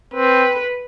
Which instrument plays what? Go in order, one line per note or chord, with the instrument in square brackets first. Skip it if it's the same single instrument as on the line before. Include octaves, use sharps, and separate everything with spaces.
[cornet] C4 [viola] B4